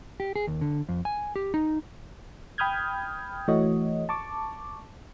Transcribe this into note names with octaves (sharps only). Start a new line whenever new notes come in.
G4
G#4
D#2
D3
F2
G#5
G4
D#4
G5 B5 D#6 F6 G6 G#6
E3 A3 F#4 C#5 D#5
A5 C#6 D6